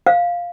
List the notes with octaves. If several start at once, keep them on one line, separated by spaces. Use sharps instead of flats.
F5